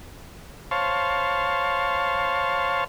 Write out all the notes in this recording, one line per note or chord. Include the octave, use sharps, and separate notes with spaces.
C5 C#5 F5 A5